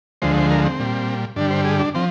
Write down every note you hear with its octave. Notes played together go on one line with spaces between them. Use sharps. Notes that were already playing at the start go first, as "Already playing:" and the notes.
D2 D3 F3 G#3 C5
C5
A#4
C4
A#2 G3
G2 D3 G3 D4
C5
G#4
D4
F3 C4